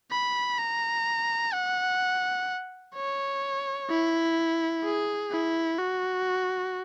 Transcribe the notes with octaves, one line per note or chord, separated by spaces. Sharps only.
B5
A#5
F#5
C#5
E4
G#4
E4
F#4